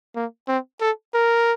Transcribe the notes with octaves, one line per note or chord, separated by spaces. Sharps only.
A#3
C4
A4
A#4